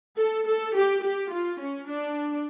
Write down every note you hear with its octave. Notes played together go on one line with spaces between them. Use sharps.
A4
A4
G4
G4
F4
C#4
D4